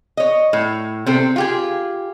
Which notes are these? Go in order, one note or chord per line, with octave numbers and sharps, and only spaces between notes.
C#5 D#5
A2
C3 C4 A4
F4 G4 G#4